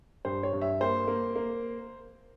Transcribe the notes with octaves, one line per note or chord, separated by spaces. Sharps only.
G2 C5
C#5
G2
E5
A#3 C5
A#3
A#3